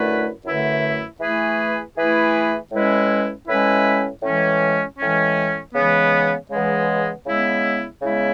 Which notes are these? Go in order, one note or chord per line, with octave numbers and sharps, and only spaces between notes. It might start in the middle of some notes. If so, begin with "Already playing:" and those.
Already playing: F#2 D3 A3 E4 B4
F#2 D3 A3 E4 B4
E3 A3 E4 G#4 B4
E3 A3 E4 G#4 B4
A2 G#3 C#4 E4 B4
A2 G#3 C#4 E4 B4
A2 E3 G#3 C#4
A2 E3 G#3 C#4
C#3 E3 G#3 B3
C#3 E3 G#3 B3
C#3 G#3 B3 E4
C#3 G#3 B3 E4